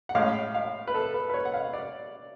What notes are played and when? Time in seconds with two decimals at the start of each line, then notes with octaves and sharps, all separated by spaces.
0.09 F#5
0.15 A2 G#3 C#4 F5
0.55 F5
0.88 B4
0.94 A4
1.14 B4
1.30 B4
1.34 C#5
1.45 F#5
1.54 F5
1.73 D5